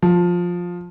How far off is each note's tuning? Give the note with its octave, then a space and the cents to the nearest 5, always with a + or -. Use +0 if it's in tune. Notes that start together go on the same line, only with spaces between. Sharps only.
F3 +10